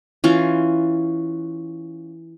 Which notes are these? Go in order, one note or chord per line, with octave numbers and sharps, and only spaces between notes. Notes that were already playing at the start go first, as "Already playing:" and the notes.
E3 C#4 F4